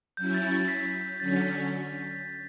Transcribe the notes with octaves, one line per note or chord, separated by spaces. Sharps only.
F#3 C#4 E4 G6
A6
A6
B6
D3 F#3 C#4 A6
B6